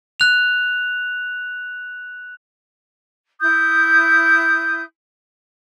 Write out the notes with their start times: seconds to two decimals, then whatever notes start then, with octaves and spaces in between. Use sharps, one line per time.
0.20 F#6 F7
3.41 E4 D#6 G6